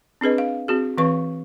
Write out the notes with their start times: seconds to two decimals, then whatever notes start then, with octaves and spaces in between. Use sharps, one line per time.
0.21 C4 D4 G#4 B4 D#5
0.38 F5
0.68 C4 F#4 G#4
0.98 E3 C4 B4 F5 C#6